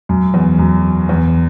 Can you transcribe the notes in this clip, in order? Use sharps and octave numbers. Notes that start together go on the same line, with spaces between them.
F#2
E2
F#2
E2